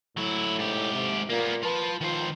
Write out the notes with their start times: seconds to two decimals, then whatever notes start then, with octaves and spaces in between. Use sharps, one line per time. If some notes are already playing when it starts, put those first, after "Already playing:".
0.17 A2 F#3 E4
0.59 G#2 G4
0.93 C3
1.30 A#2 A#3 B3
1.63 F4 B4 A5
2.01 D#3 F3 C5